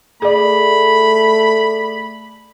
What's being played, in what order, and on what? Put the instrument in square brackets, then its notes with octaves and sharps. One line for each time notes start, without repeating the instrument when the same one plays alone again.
[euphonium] A3 [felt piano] G#4 D5 [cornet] B5